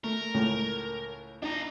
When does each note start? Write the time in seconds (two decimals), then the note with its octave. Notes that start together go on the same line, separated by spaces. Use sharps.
0.04 A3 A#4
0.34 C#2 A2 A3
1.42 D4 D#4 A#5